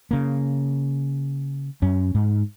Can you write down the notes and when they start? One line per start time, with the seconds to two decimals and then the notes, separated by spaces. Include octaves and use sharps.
0.11 C#3 A#3
1.82 F#2 C#4
2.15 G#2